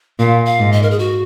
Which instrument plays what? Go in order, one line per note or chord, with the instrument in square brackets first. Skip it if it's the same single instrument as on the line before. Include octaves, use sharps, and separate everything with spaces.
[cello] A#2 [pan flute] F5
[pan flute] F5
[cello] G#2
[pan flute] D#5
A#4
G#4
F#4